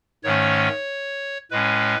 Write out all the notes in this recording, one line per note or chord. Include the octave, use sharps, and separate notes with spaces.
G#2 D#3 A3 C#4 C#5
A2 G#3 C#4 B4